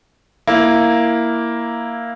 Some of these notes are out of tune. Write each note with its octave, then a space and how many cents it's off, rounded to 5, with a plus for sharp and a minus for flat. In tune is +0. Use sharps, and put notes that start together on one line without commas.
A#3 +0 E4 +0